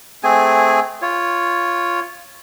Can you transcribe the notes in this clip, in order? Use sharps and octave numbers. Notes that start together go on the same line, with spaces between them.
A3 C4 G#4 G#5
F4 C#5